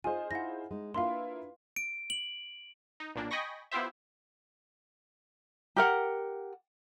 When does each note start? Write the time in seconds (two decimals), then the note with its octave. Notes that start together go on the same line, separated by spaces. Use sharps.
0.04 D#4 F4 G#4 C5 D#5 G#5
0.31 D#4 E4 F#5 A#6
0.71 G#3 D#4
0.94 A#3 D4 E4 F4 B4 F5 C6
1.76 D7
2.10 F#7
3.00 D#4
3.15 B1 A#2 A#3 D4
3.31 D#5 G5 G#5 B5 C#6 A#6
3.72 B3 E4 F4 G4 C5 E5
5.76 G4 A#4 F#5